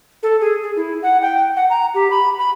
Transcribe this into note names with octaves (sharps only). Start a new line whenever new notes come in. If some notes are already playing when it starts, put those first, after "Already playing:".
A4
G#4
G#4
E4
F#5
G5
F#5
A#5
G4
B5
B5